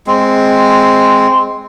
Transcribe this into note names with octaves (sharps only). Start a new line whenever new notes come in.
G#3 C4